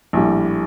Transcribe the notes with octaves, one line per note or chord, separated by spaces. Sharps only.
A#1 A2 G3